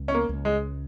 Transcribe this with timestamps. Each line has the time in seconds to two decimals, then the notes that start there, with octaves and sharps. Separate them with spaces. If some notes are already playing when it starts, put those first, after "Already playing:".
Already playing: C#2
0.08 C#4
0.14 A#3
0.29 C#2
0.45 G#3